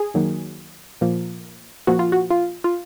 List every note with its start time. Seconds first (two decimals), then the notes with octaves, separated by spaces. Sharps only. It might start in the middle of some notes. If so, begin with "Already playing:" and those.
Already playing: G#4
0.14 F#2 D#3 F#3 A#3
1.01 A#2 F3 A#3
1.87 A#2 F3 A#3 F#4
1.99 F4
2.12 F#4
2.30 F4
2.64 F4